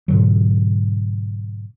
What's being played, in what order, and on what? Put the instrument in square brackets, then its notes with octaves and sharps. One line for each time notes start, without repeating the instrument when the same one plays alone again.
[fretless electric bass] G#2 B2 D3 F#3